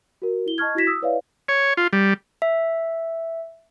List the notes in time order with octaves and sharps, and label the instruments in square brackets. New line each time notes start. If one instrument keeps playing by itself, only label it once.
[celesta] F#4 A#4
E4 G7
D#5 A5 C#6 F6 G#6
E4 F#4 G#6 A#6 B6 E7
D#6 E6
E4 B4 C#5 D5 E5 F5
[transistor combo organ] C#5
F4
G3
[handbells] E5